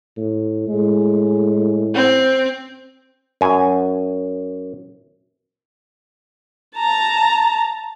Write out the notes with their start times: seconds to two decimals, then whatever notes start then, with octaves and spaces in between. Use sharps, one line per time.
0.17 A2
0.68 A2 G#3
1.94 C4
3.41 F#2 G#5
6.78 A5 A#5